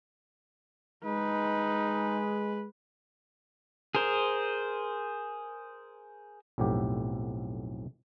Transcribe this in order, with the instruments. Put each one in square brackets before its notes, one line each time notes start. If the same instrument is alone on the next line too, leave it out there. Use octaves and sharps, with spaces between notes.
[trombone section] G#3 [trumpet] D#4 [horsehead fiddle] B4
[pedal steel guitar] G#4 A#4 C5
[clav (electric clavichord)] B1 F2 A2 B3 G4